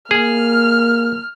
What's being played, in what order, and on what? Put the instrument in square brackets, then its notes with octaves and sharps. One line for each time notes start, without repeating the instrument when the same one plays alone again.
[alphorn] A#3 [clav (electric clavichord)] G#4 [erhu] F6